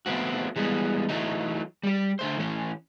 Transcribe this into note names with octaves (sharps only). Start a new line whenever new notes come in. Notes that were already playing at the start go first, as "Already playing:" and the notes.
F3 A3 B3 C4 F#4
E3 G3 G#3 A#3 B3
E3 F#3 A3 D#4
G3 G4
D3 A3 C5
E3 A3 C#4